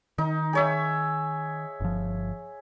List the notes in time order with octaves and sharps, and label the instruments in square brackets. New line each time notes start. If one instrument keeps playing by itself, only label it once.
[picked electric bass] D#3 [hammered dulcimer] D#4
[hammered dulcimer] G#4 C#5 E5
[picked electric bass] G1 F3